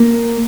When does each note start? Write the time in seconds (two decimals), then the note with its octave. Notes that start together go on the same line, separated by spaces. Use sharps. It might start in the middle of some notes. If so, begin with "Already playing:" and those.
Already playing: A#3